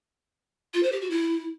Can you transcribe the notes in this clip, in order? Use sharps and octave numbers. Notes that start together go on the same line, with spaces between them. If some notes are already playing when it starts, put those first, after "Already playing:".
F4
C5
G4
F#4
E4